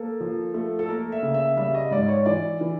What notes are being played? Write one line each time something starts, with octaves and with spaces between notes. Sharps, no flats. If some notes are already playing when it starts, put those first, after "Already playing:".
Already playing: A#3 A4
F3
A3
A4
A#3 A#4
E5
C#3
E5
G3 E5
D#5
G#2 D5
C#5
E3 D5
E3